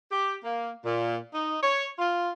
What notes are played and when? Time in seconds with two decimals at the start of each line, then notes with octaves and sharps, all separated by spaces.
0.12 G4
0.44 A#3
0.85 A#2
1.34 D#4
1.63 C#5
1.98 F4